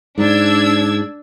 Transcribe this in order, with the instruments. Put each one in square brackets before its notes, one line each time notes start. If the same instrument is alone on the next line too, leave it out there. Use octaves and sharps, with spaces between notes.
[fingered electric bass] G#2 [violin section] D4 E6 G#6